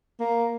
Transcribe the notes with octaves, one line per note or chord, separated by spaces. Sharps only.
A#3